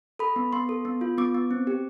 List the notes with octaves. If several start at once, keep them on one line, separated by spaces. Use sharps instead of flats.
A4 B5
B3
B3 C6
A4
B3
F4
B3 D6
B3
C4
G4